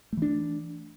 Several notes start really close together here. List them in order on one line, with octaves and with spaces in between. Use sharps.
A3 E3 D4